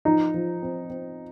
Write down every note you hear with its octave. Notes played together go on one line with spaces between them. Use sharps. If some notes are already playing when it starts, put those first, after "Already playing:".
F3 D#4
F3
C4
C4